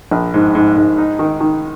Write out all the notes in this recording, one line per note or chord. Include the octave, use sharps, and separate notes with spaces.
A#1
G#2
G#2
G#2
D#4
D#3
D#3